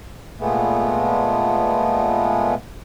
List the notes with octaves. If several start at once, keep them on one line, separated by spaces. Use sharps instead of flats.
A#2 G#3 A3 B3